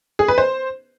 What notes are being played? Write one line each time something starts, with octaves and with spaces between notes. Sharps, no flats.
G#4
B4
C5